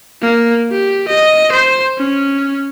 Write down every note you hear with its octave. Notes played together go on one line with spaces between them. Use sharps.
A#3
G4
D#5
C5
C#4